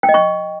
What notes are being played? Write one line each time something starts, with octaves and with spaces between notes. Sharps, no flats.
G5
D#5
C#6